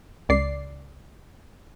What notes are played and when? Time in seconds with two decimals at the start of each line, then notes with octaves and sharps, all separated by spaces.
0.29 C#2 D5 C7